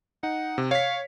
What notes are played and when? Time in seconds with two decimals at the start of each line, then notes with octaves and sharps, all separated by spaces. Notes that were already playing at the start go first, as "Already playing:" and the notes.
0.23 D#4 F#5
0.58 C3
0.71 C#5 F5 B6